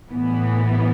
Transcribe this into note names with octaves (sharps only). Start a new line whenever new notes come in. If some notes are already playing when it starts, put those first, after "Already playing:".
A2 E3 B3